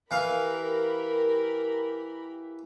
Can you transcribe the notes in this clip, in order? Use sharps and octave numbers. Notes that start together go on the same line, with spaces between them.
E3 G4 A#4 F5 B5